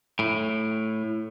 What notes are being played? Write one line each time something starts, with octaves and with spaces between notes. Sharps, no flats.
A2